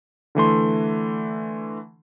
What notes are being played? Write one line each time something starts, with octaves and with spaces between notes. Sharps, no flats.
D3 E3 A3 C6